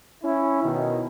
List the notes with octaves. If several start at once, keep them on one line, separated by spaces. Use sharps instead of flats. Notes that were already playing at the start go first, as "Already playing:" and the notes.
C#4 E4
B2 D#3